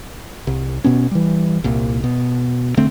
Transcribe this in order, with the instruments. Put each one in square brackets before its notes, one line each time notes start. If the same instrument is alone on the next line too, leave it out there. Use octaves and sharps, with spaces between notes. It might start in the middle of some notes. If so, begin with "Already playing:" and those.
[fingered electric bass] C2
B2 B3 C#4
E3 G3
C2 A#2
B2
E1 D3 A3 C4